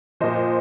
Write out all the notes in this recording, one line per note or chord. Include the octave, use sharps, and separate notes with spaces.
A#2 F3 C5 D#5